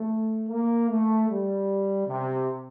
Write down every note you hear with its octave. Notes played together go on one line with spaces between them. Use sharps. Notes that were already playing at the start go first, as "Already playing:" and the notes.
Already playing: A3
A#3
A3
G3
C3